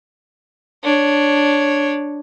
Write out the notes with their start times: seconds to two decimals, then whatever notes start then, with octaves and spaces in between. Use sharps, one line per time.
0.83 D4 C#5